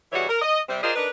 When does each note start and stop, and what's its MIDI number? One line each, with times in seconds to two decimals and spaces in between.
0.12 0.26 47
0.12 0.26 52
0.12 0.26 55
0.12 0.26 66
0.12 0.26 68
0.12 0.26 73
0.29 0.42 70
0.42 0.60 75
0.69 0.82 48
0.69 0.82 55
0.69 0.82 60
0.83 0.93 65
0.83 0.93 68
0.83 0.93 70
0.83 0.93 72
0.83 0.93 74
0.83 0.93 75
0.96 1.09 62
0.96 1.09 63
0.96 1.09 70
0.96 1.09 71